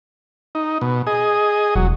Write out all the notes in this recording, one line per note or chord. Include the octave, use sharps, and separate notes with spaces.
D#4
B2
G#4 D#5
E1 F#3